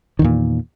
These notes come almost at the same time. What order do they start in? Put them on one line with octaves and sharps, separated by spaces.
D#3 E2 A#2